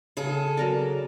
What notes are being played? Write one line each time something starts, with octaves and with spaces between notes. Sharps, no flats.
C#3 G#4 A4
F#3 A#4 D5